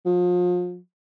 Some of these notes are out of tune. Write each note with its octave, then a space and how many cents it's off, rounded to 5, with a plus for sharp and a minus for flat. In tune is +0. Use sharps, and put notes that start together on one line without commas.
F3 +35